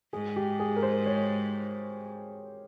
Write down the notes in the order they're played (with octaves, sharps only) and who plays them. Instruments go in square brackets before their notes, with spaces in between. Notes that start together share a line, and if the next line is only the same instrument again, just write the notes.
[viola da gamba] G#2 [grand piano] G#4
[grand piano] G4
G#4
A#4
C5
C#5